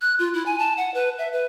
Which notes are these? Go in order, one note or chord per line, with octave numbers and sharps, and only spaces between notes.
F#6
F4
E4
G#5
A5
F#5
B4
E5
B4